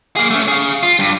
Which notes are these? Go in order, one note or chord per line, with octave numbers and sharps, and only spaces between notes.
A#3 G#4
A3 C#4
G#4 F5
F4
G2